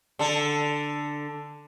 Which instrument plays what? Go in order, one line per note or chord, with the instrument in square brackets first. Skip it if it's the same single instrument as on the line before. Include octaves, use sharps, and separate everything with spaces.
[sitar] D3 A4